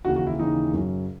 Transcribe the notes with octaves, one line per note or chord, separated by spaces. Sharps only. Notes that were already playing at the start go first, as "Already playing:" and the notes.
D#2 C#3 E3 F#4
F#4
E4
D#2 C#3 E3 D#4
F#2 C#3 F#3